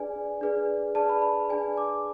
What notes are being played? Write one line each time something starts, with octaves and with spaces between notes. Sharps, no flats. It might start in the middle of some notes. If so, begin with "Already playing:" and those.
Already playing: D4 G#4 B4 D5 G#5
D4 G#4 B4 D5
D4 G#4 B4 D5 A5
B5
B5
D4 G#4 B4 D5 G#5
D6